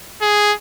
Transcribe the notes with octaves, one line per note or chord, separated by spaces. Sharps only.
G#4